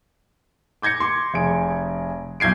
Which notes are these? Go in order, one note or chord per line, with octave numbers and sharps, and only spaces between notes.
D6 G6 G#6 A#6 C#7
C6 D6
F1 G#4 D7
B1 G6 G#6 C7 D7